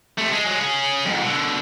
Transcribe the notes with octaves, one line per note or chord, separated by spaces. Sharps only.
C3 A3
G#3
F#3 G#3
C#4 G#4
F2 G#2
B2 D3